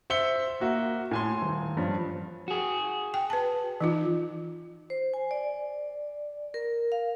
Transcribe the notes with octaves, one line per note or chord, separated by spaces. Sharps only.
C5 E5 C#7 G7
A#3 F#4 E5
A2 G#5 C6
D#1
G2 F3 C#4
F#4 G#4
G5
B4 A5
E3 D#4 F4
C5
G#5
D5
A#4
F5